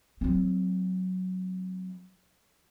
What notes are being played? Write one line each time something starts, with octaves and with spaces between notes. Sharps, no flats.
F#3 C4